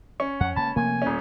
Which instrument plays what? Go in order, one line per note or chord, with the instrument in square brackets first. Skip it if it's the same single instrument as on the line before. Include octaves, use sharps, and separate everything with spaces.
[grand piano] C#4 [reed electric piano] C#6
[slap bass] F2 [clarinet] F#5
[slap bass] C#2 C#3 A#3 [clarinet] A5 [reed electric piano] B5
[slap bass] C3 F3 A3 [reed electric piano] A#3 [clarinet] G#5
[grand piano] D#1 C#4